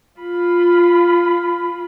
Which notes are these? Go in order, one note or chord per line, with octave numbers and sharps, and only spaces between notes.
F4 B5